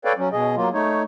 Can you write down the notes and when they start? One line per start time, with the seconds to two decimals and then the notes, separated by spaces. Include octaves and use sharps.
0.05 A4 B4 C#5 D5 F5 G5
0.18 F#3 C#4
0.32 B2 G#4 D#5
0.56 F#3 A#3 F4
0.74 A3 D#4 C#5